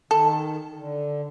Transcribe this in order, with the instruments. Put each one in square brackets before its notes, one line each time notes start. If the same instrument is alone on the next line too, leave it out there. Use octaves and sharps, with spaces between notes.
[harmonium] D#3 [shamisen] A4
[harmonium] D3